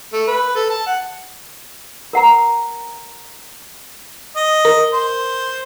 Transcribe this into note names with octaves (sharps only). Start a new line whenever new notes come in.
A3
B4
A4
A5
F#5
A#4 F#5 A#5
D#5
A#4
C5